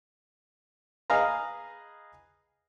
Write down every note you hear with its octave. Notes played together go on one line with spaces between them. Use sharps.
G#4 B4 D#5 F5 G#5 A#5